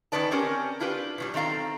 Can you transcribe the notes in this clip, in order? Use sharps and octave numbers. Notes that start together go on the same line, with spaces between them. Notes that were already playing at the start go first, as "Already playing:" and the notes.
D#3 C4 C#4 B4 D5 A5
C4 C#4 G4 A#4
D4 E4 F4 G4 B4
B2 F#3 G3
D#3 C4 A4 F5 A#5